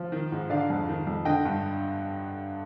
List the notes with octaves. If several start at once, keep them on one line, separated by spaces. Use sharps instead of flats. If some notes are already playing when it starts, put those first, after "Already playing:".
Already playing: F3
D#3
G#2
D3 D5 F5
F2
D#3
F2
D3 D#5 G5
G2